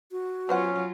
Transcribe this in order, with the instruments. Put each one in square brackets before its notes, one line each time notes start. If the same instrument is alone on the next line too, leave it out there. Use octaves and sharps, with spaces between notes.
[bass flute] F#4
[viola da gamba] F#3 F4 [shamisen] B3 C5 F#5 [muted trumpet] C#4